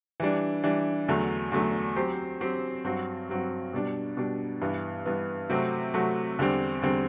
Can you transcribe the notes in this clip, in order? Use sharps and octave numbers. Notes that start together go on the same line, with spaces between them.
E3 G3 D4
E3 G3 D4
E2 D3 F#3 A3
E2 D3 F#3 A3
F#3 C4 G4 C5
F#3 C4 G4 C5
G2 F#3 C4 F#4
G2 F#3 C4 F#4
B2 G3 D4
B2 G3 D4
G2 E3 B3
G2 E3 B3
C3 F#3 A3 C4 F#4
C3 F#3 A3 C4 F#4
E2 D3 G3 C4
E2 D3 G3 C4